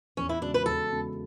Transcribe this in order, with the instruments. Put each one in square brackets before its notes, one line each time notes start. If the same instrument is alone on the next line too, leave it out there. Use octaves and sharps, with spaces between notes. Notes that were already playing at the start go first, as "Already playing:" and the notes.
[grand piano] E2 [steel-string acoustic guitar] C#4
[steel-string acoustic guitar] E4
[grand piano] C#3 G#3 B3 F#4 [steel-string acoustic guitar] D4
[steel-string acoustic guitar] B4
[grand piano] E2 [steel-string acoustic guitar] A4
[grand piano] C#3 G#3 B3 F#4